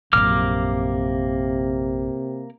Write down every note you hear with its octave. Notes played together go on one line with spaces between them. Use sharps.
A#1 F#2 C3 A#3 D6 F6